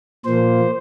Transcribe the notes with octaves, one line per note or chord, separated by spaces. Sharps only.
A#2 F3 A#3 C5